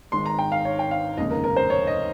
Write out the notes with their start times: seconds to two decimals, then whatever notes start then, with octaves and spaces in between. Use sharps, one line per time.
0.12 G#1 G#2 D#3 G#3 C6
0.26 A#5
0.39 G5
0.52 F5
0.65 C#5
0.79 G5
0.91 F5
1.17 F1 D#2 C#3 G#3 D#5
1.31 A#4
1.44 A#4
1.56 C5
1.70 C#5
1.87 D#5